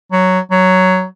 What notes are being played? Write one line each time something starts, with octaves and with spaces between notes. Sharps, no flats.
F#3
F#3